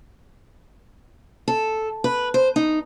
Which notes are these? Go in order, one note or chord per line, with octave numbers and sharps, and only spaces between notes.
A4
B4
C5
D#4